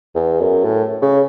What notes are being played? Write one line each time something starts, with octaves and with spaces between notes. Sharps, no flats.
E2
F#2
A2
C#3